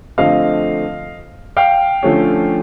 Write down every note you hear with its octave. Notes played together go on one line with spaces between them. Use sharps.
D3 F3 A3 C4 D#5 F5
F5 G5
D3 F3 A3 C#4